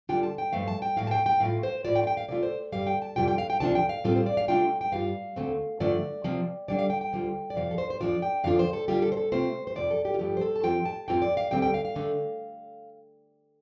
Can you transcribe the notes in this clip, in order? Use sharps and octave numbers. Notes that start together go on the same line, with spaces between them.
D3 G3 D4 F4 G5
A5
G5
G2 F3 A3 F5
A5
G5
A2 F3 A3 F5
A5
G5
G5
A2 A3 F4 F5
C5
A2 A3 F4 D5
G5
F5
G5
F5
C3 A3 F4 D5
C5
G2 D3 G3 F5
G5
A5
F2 C3 G3 F4 G5
G5
F5
G5
D2 C3 F3 D4 F4 A5
G5
F5
A2 G3 C4 F4 A4
C5
D5
F5
C3 A3 D4 F4 G5
G5
G2 G3 F4 F5
D2 D3 A3 C4
G2 D3 F3 A3 F4 D5
C3 F3 C4 F4
D3 G3 D4 D5
F5
G5
G5
D2 D3 G3 F4
D5
F2 C3 F3 F5
A4
C5
C5
F2 F3 D4 F4 D5
G5
F2 D3 F3 D4 F4 F5
C5
A4
D3 G3 F4 G4
A4
C5
A4
C3 A3 C4 F4 C5
C5
F2 C3 F3 D5
A4
G4
F4
G2 F3 A3 G4
C5
A4
A5
F2 F3 C4 F4 G5
A5
F2 F3 C4 F4 G5
D5
F5
D2 D3 G3 C4 G5
G5
F5
F5
D3 A3 D4